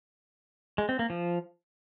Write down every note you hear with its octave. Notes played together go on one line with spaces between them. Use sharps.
G#3
C4
A#3
F3